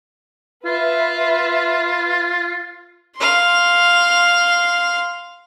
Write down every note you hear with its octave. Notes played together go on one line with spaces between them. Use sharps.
F4 B4 E5
F5 C6